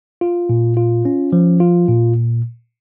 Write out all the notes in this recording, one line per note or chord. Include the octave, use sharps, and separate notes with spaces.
F4
A#2
F4
C#4
F3
F4
A#2